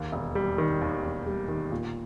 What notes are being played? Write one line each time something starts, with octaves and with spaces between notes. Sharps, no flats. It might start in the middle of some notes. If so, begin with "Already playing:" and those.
Already playing: D#2
E1
G3
D#3
D#2
E1
G3
D#3
A#2